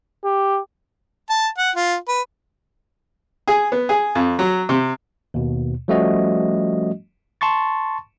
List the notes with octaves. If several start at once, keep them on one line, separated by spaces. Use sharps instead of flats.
G4
A5
F#5
F4
B4
G#4
B3
G#4
F2
F#3
C3
D#2 B2
F3 G3 A3 C#4 F#4 D#5
A5 C6 C#6 A6